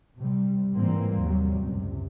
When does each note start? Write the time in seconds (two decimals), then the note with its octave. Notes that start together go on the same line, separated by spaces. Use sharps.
0.19 C3 G3
0.74 G#2 E3 F3 G3 A#3 C4
1.21 D#2 G#2 C3 F#3 G3
1.61 C#2 F#2 C3